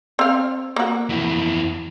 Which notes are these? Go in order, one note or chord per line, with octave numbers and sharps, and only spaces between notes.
C4 F5
A#3 F#4
F2 E3